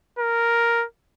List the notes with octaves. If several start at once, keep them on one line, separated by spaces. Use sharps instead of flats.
A#4